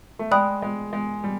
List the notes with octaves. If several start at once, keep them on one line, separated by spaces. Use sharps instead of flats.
A3
G#3 D5 G5 B5 D#6 F#6
G#3
G#3
G3